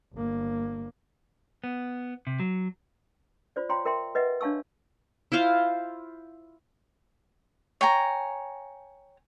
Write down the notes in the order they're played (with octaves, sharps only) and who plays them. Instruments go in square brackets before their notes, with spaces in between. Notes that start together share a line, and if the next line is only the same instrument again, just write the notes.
[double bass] G1 A#3
[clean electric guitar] B3
C3
F#3
[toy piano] F4 C5 D5
F4 C#5 F5 G5 A#5 C6
A#4 E5 G5 C6
B4 D#5 E5 F#5
D4 C#5 F5 A5 C#6 E6
[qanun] E4 F4 C5 F5
[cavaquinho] C#5 G5 G#5 A#5